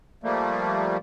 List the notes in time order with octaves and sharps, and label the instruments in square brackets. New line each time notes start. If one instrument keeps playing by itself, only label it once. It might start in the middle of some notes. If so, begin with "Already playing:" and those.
[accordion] F3 G3 A3 A#3